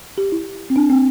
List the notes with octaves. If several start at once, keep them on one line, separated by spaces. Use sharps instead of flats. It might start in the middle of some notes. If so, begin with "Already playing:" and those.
G4
E4
C4
D4
C4